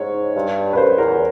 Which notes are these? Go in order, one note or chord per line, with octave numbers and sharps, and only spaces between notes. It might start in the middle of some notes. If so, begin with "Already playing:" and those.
Already playing: G#2 C#5
G2
B4
F#2 C5
E2 A#4